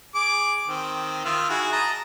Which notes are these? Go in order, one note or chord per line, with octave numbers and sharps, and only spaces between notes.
G#4 D6
D#3 C4
D#3 F4 E5
E4 F#4 G#4
D#5 A5 A#5